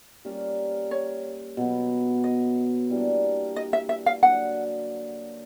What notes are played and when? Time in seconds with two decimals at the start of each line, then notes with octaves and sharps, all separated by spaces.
0.25 G3 A#3 C#4 F4
0.91 C#5
1.57 B2 F#3 B3
2.24 D#5
2.89 E3 G3 A#3 D4
3.56 D#5
3.73 E5
3.89 E5
4.06 F5
4.23 D3 F#3 A#3 F#5